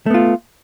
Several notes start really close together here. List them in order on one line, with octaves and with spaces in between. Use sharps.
A3 B3 F4